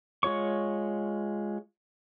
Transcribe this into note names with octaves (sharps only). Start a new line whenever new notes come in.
G#3 F4 C#5 C#6